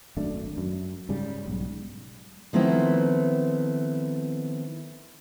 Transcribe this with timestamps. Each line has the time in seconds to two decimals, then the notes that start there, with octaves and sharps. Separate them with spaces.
0.17 G#1 F#2 A3 D4
0.57 F#2
1.09 G#2 C#3 G3
1.46 B1 G#2
2.53 D#3 F3 A3 B3 C4 E4